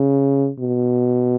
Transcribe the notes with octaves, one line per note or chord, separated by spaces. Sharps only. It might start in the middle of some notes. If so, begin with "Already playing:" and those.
Already playing: C#3
B2